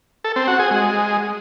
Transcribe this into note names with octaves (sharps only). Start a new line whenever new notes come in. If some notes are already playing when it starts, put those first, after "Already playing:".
A4
C4
F#4
G#4
G#3